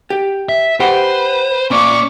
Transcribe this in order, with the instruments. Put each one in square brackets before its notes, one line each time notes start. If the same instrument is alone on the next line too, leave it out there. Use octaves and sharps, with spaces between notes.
[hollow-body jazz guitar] G4
[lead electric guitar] E5
[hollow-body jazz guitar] G4 F#5 B5 [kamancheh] B4 [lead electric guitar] C5
[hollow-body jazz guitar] A#2 [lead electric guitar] C#4 D5 [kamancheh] C#6 D6